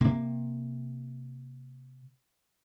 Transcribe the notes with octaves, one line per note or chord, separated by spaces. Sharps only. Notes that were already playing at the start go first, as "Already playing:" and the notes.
C3 A#3